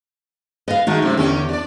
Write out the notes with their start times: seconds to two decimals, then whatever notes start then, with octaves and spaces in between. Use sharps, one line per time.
0.68 B3 D#5 F5
0.87 D#3 G#3 A3 D#4 F#4
1.02 F#2 C3 F3
1.17 E2 D3 C#4 G4
1.49 D4 D5